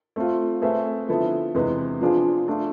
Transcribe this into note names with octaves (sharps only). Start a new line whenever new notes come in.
A3 C4 F4
A3 C4 G#4 B4 E5
D3 F3 B3 E4 A4
E2 C3 G#3 B3
F3 B3 D4 F4 G#4
A3 D4 F4